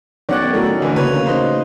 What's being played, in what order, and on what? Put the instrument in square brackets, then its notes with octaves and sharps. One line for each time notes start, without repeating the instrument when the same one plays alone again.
[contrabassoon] B1 [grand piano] D#3 F#5 F#6 [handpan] C#4 C#5 D5
[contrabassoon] A2 [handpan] F#4 A4 A#4
[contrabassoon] D2 [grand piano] D3 E3 D#4
[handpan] C#3 A#3 [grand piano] B4 C#5
[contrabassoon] D2
[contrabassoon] A1 [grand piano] D#4 B4 C5